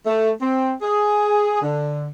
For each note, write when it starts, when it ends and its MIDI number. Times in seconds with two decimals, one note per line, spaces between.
0.06 0.30 57
0.41 0.72 60
0.82 1.61 68
1.61 2.08 50